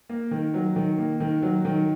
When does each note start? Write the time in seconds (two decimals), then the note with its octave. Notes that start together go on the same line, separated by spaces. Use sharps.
0.09 A#3
0.31 D#3
0.54 F#3
0.76 D#3
0.98 A#3
1.20 D#3
1.43 F#3
1.65 D#3